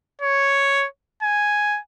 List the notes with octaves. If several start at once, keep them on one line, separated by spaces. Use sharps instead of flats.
C#5
G#5